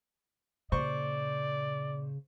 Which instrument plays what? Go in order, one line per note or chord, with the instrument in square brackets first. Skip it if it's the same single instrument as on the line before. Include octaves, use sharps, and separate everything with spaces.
[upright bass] A#2 [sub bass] C#3 [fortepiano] C5 C#6 [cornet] D5